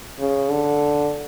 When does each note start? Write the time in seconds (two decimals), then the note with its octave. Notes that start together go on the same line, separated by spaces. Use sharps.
0.20 C#3
0.50 D3